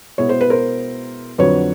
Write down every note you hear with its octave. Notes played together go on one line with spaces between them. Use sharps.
B2 G#3 B3 E4 C#5
C5
B4
A#4 C5
F2 D3 F#3 B4 C#5